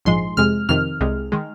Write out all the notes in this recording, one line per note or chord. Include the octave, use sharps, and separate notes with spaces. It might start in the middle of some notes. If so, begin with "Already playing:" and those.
A#1 G#2 F3 G#3 C6
F2 C3 G#3 F6
F2 C3 D#3 F6
C2 C3 G#3
D#3 G#3